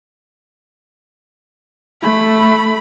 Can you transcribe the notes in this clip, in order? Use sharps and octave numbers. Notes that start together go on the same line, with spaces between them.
A3 B5